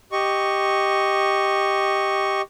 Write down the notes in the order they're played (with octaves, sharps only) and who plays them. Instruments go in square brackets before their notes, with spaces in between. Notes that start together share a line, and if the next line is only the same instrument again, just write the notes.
[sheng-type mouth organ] G4 D#5 C#6